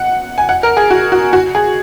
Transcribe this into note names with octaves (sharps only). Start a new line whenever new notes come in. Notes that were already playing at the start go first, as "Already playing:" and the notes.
Already playing: F#5
G#5
F#5
A#4
G#4
F#4
F#4
F#4
G#4